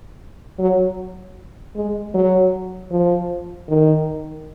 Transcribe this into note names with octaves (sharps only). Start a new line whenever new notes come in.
F#3
G#3
F#3
F3
D#3